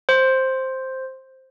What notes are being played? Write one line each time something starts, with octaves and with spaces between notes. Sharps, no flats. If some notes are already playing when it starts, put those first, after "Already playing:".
C5